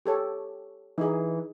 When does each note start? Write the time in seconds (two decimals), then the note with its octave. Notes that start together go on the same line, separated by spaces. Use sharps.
0.06 G4 A4 C#5
0.98 E3 D#4 G#4